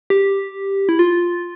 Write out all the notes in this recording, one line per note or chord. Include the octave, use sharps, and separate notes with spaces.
G4
E4
F4